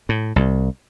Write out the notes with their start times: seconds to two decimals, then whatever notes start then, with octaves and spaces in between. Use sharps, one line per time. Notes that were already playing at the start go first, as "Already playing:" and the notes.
0.09 A2
0.36 C2